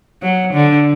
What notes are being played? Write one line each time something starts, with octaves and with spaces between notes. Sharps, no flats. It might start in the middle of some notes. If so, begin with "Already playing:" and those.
F#3
D3